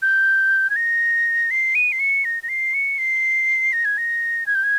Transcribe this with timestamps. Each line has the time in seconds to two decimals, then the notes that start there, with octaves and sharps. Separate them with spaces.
0.02 G6
0.70 G#6
0.76 A#6
1.51 C7
1.75 D#7
1.92 C7
2.00 C#7
2.25 A#6
2.43 A#6
2.49 C7
2.74 C#7
2.98 C7
3.73 A#6
3.85 G#6
3.98 A#6
4.47 G#6
4.55 G6
4.64 G#6